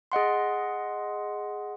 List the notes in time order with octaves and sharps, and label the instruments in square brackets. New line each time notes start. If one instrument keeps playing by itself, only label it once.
[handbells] G#4 D#5 F#5 C6